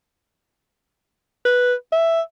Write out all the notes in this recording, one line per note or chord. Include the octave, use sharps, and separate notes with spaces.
B4
E5